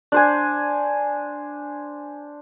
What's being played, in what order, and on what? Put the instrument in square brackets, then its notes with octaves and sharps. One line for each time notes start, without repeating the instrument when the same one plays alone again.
[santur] D4 C5 G#5